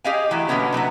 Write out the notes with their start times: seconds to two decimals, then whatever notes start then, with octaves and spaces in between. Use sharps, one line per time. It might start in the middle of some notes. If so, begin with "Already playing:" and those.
0.04 G4 G#4 D#5 F5 G5 G#5
0.30 D3 E3 F#3 A3 G4
0.48 B2 D3 F#3 A#3 B3 C#4
0.73 C3 F#3 A#3 B3